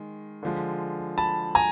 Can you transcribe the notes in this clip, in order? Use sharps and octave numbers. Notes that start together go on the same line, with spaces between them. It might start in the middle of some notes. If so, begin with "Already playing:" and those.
Already playing: D#3 G#3
D3 F3 G#3
A5 B5
G#5 A#5